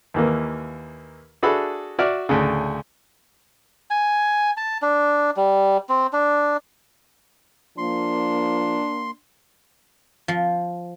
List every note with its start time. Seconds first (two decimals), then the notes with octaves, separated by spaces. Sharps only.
0.14 D#2 E3 A#3
1.43 D4 F#4 G#4 A4 E5 B5
1.99 F#4 D5 E5 D6 F6
2.29 D2 A2 C#3
3.90 G#5
4.57 A5
4.82 D4
5.37 G3
5.89 C4
6.13 D4
7.78 F3 A#3 D4 C6
10.28 F3